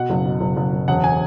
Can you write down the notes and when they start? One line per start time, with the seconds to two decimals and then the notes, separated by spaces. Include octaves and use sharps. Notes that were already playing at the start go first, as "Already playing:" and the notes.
Already playing: B2 F#5
0.10 F#1
0.25 B2
0.40 F#1
0.56 F#1
0.73 F#1
0.88 E1 F#5
1.04 G#5